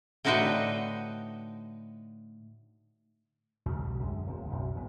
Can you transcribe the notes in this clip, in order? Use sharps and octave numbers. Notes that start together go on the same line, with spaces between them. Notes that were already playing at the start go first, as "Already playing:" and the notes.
A2 D3 D#4 F#4 B4 G5
D#2 G#2 C#3
B1 G3
F#2 D3 G#3
D1 D#2 E3 C4
B1 F#2
E2 G#2